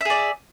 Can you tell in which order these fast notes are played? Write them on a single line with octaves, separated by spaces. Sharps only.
E5 G#4 D5